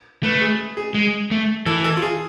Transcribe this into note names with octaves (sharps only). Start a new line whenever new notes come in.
A3 B4
G#4
G#4
G#3
A3
E3 A4
A4
F4
G#4